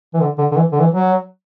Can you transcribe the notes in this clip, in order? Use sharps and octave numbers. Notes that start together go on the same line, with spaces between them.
E3
D3
D3
D3
E3
D3
E3
F#3